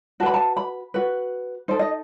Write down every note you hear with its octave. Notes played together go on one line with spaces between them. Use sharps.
F#4 B4 A5 B5
A5
B5
F#4 B4
D#4 A4 C5
D#5